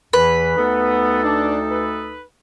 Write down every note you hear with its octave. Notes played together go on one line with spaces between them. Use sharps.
E2 E3 B4
D2 B3 D#4 A4
D4
B4